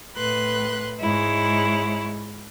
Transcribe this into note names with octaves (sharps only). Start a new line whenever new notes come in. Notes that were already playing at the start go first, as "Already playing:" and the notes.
A2 B4 C6 F#6
G#2 G#3 E4 C#5